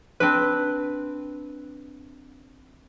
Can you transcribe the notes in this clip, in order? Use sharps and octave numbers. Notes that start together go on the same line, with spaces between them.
C4 D4 B4